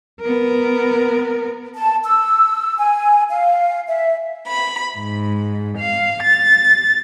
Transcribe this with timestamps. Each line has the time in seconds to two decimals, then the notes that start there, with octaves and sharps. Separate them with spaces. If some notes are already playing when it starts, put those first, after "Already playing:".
0.21 B3 A#4
1.76 A5
2.04 E6
2.78 G#5
3.30 F5
3.88 E5
4.47 B5
4.97 G#2
5.78 F5
6.23 A6